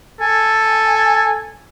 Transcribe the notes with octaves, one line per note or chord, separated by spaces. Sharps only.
A4 G#5